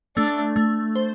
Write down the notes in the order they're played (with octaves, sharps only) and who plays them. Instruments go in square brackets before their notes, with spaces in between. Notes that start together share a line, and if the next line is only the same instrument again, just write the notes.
[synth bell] A3 [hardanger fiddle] D4
[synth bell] A3
C5